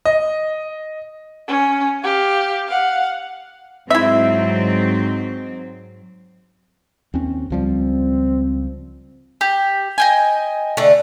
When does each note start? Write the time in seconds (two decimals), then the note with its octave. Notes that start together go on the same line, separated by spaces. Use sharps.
0.05 D#5
1.48 C#4
2.03 G4 F5
2.68 F5 F#5
3.90 G#2 F#3 C4 E4 E5
7.14 D#2 C4 C#4
7.50 C#2 F3 G3 C4
9.41 G4
9.98 D#5 G5 G#5
10.77 D3 A3